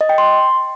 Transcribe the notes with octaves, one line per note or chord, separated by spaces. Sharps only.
D#5
G5
C6